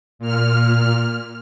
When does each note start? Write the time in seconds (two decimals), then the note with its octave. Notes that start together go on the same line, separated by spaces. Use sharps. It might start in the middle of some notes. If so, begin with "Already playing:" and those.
0.19 A#2 F6